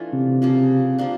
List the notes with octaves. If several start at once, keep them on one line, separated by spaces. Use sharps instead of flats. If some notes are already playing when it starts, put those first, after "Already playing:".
Already playing: E3 A3 D4 F4
C3
C#3 F3 A#3
F3 A#3 D4